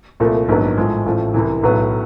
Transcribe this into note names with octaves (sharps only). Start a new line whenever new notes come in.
C2 A#2 F3 A3
A#1 G#2 D#3 F#3 B3
A2 F3 G#3
A1 A2 F3
C2 C3 E3
B1 A2 F#3 B3